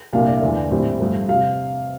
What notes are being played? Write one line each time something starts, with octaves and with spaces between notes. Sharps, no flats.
C2 A#2 G3 A#3 D4 F5
D5
E5
E2 D3 A3 D5
A#1 A2 G3 C4
G2 F3 A3
C3 F5